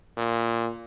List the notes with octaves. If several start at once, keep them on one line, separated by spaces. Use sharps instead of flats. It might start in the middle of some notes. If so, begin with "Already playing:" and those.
A#2